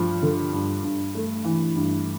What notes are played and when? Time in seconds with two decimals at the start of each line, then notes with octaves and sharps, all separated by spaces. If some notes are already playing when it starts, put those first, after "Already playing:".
Already playing: G2 F3
0.22 D3
0.53 G2
0.83 G2
1.15 A3
1.44 E3
1.76 G2